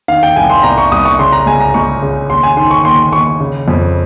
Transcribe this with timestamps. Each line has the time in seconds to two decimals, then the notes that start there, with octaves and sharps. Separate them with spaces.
0.08 D#3 F5
0.23 G5
0.36 C2 G#5
0.50 C6
0.63 C2 A#5
0.78 C#6
0.91 C2 D#6
1.05 C#6
1.19 C#3 C6
1.32 A#5
1.46 C#2 G#5
1.61 A#5
1.74 C#2 C#6
2.02 C#3
2.30 D#2 C6
2.43 G#5
2.57 D#3 C6
2.71 C#6
2.85 D#2 C6
3.13 D#2 C#6
3.40 C#3
3.68 F2